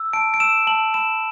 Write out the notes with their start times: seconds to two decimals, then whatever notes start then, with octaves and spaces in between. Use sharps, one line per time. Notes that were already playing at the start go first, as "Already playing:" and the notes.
Already playing: E6
0.13 A5 D7
0.34 D7
0.40 E6 E7
0.67 A5 F#7
0.94 B5 E7